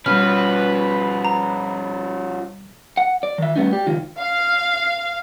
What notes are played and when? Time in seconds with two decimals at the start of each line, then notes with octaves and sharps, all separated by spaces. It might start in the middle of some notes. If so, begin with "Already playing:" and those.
0.06 B2 F3 G3 C#4 B4 F6
1.25 A#5
2.97 F#5
3.23 D5
3.38 D#3 E5
3.56 G3 A3 B3 C#4 D#4
3.73 G4 D5
3.86 C#2 D#3 F4
4.19 F5